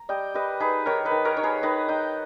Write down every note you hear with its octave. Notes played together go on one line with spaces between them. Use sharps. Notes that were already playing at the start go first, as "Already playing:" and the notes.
Already playing: A#5
G3 D#5 G5
G3 B4 D#5
D#4 G#4 B4
D#3 A#4 C#5
B4 D#5
D#3
A#4 C#5
D#3 C#5
G#4 B4
D#3 B4 D#5
D#4 D#5 G5